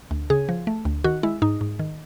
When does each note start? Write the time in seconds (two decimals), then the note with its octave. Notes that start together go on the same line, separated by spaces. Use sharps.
0.11 D2
0.30 C#3 G#4
0.49 F3
0.67 A3
0.85 D2
1.04 D#3 F#4
1.23 G#3 E4
1.42 G#2 D#4
1.61 G#2
1.79 D#3